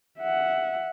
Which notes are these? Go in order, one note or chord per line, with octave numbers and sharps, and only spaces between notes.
E5 F#5